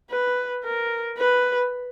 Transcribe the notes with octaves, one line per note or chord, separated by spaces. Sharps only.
B4
A#4
B4